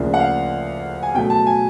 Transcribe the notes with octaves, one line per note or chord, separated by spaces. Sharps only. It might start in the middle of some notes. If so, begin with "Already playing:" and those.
Already playing: D2 C#3 F3 A#3 D4
F#5
F5
G#5
B2 F#3 A3 G5
A5
G#5